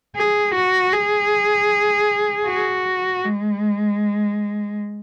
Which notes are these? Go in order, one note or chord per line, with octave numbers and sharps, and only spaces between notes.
G#4
F#4
G#4
F#4
G#3